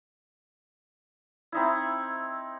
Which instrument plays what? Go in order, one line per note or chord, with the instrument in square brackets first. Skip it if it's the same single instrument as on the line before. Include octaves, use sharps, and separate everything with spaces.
[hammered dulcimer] C4 D#4 E4